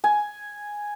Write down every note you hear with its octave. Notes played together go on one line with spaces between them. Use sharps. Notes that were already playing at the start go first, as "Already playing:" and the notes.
G#5